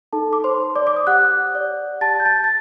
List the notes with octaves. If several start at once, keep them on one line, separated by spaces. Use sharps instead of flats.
D#4 A4 A5
D6
C5 C6
C5
D5 D6
D6
D#6
G4 F#5 F#6
D5
G4 A5 A6
G6
A5 A6
A6